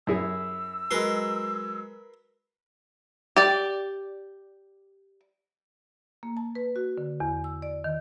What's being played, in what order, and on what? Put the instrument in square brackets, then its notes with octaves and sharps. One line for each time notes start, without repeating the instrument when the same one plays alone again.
[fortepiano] F#2 E4 G#4 [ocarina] E6
[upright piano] F#3 G#3 [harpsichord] A#4 B4 C6
[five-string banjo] G4 D5
[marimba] A#3
A5
B4
F#4
D3
E2
E6
D5
D#3